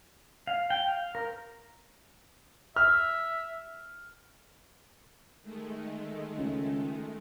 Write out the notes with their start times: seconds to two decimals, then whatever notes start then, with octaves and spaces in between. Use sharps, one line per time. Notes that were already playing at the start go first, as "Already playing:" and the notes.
0.47 F5
0.70 G5
0.88 F5
1.15 A#4
2.76 E5 F6
5.42 D#3 G#3 A3
6.38 C#2